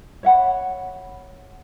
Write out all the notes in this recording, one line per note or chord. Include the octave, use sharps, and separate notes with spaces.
C#5 E5 F#5 B5